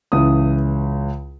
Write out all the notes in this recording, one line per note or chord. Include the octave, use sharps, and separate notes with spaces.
C#2 C#3 E3 D#6